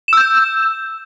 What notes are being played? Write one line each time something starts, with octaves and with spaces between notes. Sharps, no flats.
E6 G6 E7